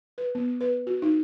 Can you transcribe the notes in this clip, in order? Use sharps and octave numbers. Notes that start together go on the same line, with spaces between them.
B4
B3
B4
F#4
D#4